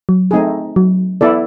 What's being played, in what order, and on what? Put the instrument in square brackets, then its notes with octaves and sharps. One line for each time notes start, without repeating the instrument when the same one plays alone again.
[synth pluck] F#3
[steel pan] A3 C4 D#4 G#4
[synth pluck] F#3
[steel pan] B3 E4 A4 D5